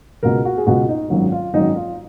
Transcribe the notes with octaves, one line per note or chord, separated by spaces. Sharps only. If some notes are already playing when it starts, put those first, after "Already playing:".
C#2 B2 G#3 A#4
F#4
G#4
C#2 B2 G#3 F#4
D#4
G#1 F#2 D#3 F#3 F4
F4
G#1 F#2 D#3 F#3 D#4
F4